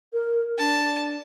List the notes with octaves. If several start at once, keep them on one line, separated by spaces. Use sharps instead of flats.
A#4
D4 A5